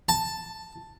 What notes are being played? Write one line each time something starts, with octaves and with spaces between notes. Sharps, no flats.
A5